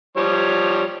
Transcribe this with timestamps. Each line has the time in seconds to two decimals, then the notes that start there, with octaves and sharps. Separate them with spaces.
0.17 F3 G3 C#5